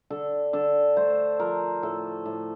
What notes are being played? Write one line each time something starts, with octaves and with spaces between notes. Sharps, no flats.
D3 A4
D3 A4
A3 C5
F3 A#4
A2 A4
A2